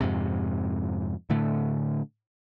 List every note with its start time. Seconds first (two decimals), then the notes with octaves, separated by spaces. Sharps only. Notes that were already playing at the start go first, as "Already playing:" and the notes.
0.01 F2 G#2 C3
1.30 A2 D3 A3